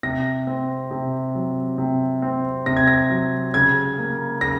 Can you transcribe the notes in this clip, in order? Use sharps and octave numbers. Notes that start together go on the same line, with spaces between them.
C3 A#6
C4
C3
F#3
C3
C4
C3 A#6
G#6
A#6
F#3
C#3 G#6
A#3
C#3 A#6